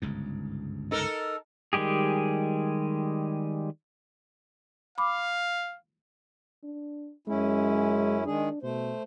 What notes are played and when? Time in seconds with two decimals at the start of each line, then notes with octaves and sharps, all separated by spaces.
0.02 G1 C#2 G#2
0.91 D#4 A4 A#4
1.73 D#3 G3 G#3 G4 G#4
4.98 F5 B5 D6
6.64 D4
7.27 F#2 G#3 C#4 E4
8.25 D#3 G#3 D4 G#4
8.63 B2 A3 C5